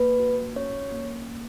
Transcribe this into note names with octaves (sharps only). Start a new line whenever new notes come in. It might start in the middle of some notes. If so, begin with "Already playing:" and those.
Already playing: A#3 B4
F#4
C#4 C#5
A#3
A#3